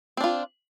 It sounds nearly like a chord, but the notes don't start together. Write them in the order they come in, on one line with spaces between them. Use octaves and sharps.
C4 D4 F4